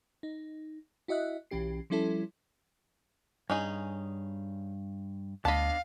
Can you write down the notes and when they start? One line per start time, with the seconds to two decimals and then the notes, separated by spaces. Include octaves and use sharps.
0.23 D#4
1.08 E4 F#4 D#5 E5 F#6
1.51 B1 E3 C#4 G4 C7
1.90 F3 G3 C#4 E4 A4
3.50 G2 C#4 D#4 G#4
5.45 D2 B3 D4 D#5 F5 A5 B5